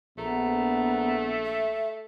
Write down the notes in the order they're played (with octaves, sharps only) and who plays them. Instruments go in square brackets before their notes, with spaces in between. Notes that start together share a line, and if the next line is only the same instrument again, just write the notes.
[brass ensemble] A#1 [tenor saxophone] A3 [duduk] B3 [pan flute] A#5
[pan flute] E5